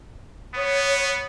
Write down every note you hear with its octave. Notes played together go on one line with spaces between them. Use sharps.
B3 C#5